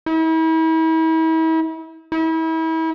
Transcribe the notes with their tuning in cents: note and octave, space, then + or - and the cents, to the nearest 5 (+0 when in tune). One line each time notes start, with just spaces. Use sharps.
E4 -40
E4 -35